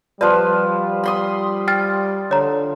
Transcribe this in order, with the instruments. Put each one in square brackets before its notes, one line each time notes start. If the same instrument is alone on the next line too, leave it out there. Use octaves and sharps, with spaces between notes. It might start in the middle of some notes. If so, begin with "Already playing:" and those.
[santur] F3 F4 B4 [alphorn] G3 [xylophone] D5
[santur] B5 C6 D#6
[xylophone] G5 F6 A6
[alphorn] D3 [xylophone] C#5 A#5